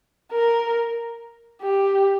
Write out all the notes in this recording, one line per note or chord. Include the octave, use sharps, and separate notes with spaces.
A#4
G4